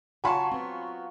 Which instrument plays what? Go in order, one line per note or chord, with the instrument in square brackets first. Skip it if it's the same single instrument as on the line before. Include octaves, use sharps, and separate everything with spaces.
[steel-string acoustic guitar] C#3 F#5 A5 [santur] F#3 F4 C#6 [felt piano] G#5 B5
[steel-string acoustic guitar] B3 C4